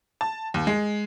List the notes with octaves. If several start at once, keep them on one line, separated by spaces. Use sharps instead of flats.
A5
D#2
G#3